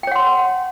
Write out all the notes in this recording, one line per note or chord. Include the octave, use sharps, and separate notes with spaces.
C#5 F#5 G5 C6